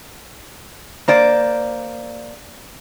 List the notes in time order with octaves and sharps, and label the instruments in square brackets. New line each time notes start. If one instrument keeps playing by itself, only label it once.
[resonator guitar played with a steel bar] A#3 C5 D5